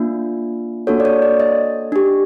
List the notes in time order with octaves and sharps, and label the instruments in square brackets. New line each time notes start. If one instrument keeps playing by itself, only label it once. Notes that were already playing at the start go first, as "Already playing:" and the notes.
Already playing: [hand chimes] A#3 D4 F4
A#3 D4 F#4 A4 C#5
D5
C#5
D5
D#5
D4 G4